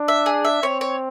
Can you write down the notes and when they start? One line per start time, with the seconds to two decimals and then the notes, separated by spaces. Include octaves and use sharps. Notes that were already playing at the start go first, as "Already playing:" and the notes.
Already playing: D4
0.08 E5
0.26 G#4
0.45 E5
0.63 C4 C#5
0.81 C#5